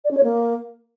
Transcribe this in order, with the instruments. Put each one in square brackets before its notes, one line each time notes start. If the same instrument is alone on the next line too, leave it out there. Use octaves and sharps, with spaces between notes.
[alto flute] D5
C#4
C#5
A#3